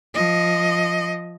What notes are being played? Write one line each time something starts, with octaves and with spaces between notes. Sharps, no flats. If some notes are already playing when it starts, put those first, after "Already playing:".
F3 D#5